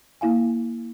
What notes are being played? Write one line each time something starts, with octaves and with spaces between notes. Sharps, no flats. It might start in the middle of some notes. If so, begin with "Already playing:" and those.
A#3 E4 F5 G#5